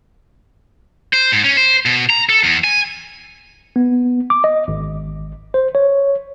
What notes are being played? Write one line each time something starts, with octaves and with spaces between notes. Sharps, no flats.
C5
G#2
C#4
C5
B2
A#5
A4
E2
G#5
B3
D6
D#5
G#1
C5
C#5